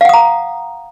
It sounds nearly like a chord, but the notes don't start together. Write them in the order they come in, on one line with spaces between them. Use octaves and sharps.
F5 F#5 D#6 A#5